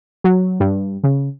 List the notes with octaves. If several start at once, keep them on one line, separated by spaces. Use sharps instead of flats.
F#3
G2
C#3